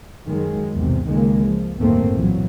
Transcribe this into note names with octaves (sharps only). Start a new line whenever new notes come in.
F#2 D#3 F#3 G#3
B1 E2 G#2 C3
C#2 D#3 G#3 A#3
F3
G1 D#2 A2 A3 A#3 C4
C2 A#2 E3 F#3